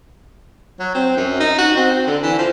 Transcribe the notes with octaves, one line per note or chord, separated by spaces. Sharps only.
F#3
C4
F#2
D#4
F#4
C4
D3
E3
F3